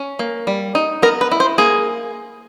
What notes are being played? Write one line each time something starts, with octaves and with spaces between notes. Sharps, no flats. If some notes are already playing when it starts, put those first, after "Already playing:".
Already playing: C#4
A#3
G3
D#4
B3 A#4
B4
E4
C5
A#3 G#4